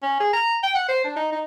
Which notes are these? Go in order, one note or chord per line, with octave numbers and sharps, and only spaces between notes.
C#4
G#4
A#5
G5
F#5
C5
D4
D#4
D#4